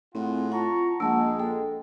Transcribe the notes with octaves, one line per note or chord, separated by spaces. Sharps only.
A2 C4 F4 G#4 F#5
F4 F#5 A5 A#5 C#6
A#1 G#3 A#3 F#5 A5 E6
A4 G5